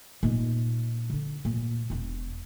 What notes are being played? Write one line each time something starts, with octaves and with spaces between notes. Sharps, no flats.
A#2 D#4
D3 D4
A#2
E1 D4